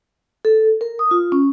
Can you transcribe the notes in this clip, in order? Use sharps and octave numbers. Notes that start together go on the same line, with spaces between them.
A4
A#4
D#6
F4
C#4